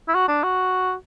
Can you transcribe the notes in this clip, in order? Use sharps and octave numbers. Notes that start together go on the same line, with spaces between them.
E4
F#4
D4
F#4